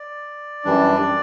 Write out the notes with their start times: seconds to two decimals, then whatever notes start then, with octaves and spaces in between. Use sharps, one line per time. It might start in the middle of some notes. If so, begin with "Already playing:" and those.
Already playing: D5
0.65 F#2 E3 G3 D4